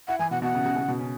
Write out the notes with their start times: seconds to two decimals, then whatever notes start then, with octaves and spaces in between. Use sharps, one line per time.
0.08 E4 F#5
0.19 E3 G#5
0.31 B2 F#5
0.42 B2 F#5
0.54 C#3
0.66 C#3
0.76 C#3
0.88 B2
0.99 C#4